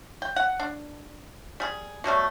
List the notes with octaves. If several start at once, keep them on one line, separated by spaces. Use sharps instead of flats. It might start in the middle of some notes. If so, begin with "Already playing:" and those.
G5
F#5
D4
G3 G#4
B2 F#3 G3 A3